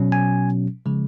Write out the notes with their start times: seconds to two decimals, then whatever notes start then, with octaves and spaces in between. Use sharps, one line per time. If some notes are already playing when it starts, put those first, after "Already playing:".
Already playing: B2 F#3 C#4
0.12 G#5
0.86 C#3 F3 G#3